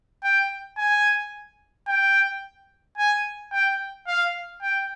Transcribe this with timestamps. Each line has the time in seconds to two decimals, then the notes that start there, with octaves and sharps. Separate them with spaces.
0.24 G5
0.78 G#5
1.88 G5
2.98 G#5
3.52 G5
4.07 F5
4.62 G5